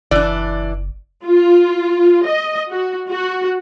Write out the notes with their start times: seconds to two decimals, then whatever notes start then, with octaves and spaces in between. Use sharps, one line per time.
0.11 F#1 E3 D4 D5
1.24 F4
2.27 D#5
2.70 F#4
3.09 F#4